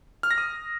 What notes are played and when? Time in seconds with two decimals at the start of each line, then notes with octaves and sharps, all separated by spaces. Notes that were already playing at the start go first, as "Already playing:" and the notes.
0.23 F6
0.31 A#6
0.38 D#6